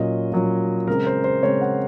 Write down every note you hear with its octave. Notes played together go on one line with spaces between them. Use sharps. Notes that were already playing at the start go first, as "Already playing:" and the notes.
Already playing: A#2 F#3 C#4 D#5
A#2 F#3 C#4
C#3 G#3 C4 A#4
C5
C5
C#3 G#3 C4 C#5
F#5